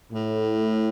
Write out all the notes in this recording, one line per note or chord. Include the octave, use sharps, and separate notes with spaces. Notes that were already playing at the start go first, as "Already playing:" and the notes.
A2